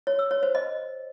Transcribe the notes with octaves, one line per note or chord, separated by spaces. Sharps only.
C#5
E6
C#5
C5
D#5